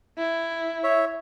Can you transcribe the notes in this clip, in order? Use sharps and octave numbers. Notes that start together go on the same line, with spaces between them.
E4
C#5 E5